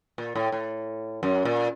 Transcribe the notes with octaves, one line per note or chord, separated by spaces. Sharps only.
A#2
A2
A2
F#2
A#2